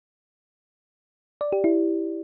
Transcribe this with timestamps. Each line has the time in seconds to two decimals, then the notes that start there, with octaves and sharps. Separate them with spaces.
1.41 D5
1.52 G4
1.64 E4